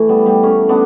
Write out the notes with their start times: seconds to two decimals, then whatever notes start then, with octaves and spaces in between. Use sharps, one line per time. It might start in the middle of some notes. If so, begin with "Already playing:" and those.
Already playing: E3 A3
0.09 G3 B3
0.26 G3 B3
0.43 A3 C#4
0.69 B3 D4